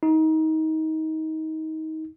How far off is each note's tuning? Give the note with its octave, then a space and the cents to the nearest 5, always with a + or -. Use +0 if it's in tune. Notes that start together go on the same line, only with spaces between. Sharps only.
D#4 +25